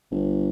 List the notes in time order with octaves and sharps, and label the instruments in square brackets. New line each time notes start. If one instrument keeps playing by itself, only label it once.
[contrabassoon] G1